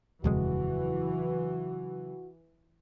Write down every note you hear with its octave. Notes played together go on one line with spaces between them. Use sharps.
D#1 F2 C#3 E3 F#3 G#3 F#4